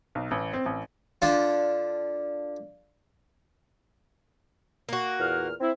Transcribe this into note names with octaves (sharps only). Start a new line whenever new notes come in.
B1
A1
C4
A1
D3 D4 F4 D5 F5
A#3 F#4
E2 A#2 F6
C4 E4